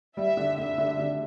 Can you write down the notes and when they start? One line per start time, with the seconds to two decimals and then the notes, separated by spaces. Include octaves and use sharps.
0.17 G3 E5
0.37 D3
0.58 D3 E5
0.78 D3
0.99 D3